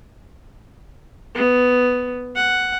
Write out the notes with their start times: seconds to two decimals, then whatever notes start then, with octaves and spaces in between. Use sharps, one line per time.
1.35 B3
2.35 F#5